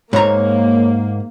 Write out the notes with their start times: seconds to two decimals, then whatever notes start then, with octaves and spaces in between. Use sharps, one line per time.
0.13 G#2 A#3 C#5 A#5